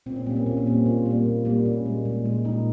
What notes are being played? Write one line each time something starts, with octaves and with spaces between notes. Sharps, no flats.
A#2 C4
C#4
G3 A#3 C4
C#4
A#2 C4
C#4
G3 A#3 C4
A#2 F4
G3 A#3
A#2
G3 A#3
A#2 C#4
G#3
A#2
G#3
A#2 D#4